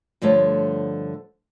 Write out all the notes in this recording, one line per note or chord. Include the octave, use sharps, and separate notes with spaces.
G2 D3 F3 A3 C#5